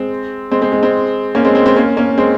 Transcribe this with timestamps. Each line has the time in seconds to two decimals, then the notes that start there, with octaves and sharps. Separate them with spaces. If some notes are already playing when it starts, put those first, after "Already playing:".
Already playing: G#3 C4
0.51 G#3 C4
0.62 G#3 C4
0.72 G#3 C4
0.83 G#3 C4
1.35 A#3 C#4
1.45 G#3 C4
1.55 G#3 C4
1.66 G#3 C4
1.76 A#3 C#4
1.97 A#3 C#4
2.18 G#3 C4